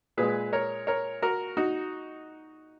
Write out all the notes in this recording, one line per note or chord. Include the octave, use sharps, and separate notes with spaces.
A#2 G#3 G#4 B4
A#4 C#5
A#4 C#5
F#4 A#4
D#4 F#4